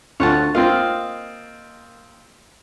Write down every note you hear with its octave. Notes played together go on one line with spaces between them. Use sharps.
D2 F4 C#5 F#5 A5
A#3 C4 F4 D#5 F5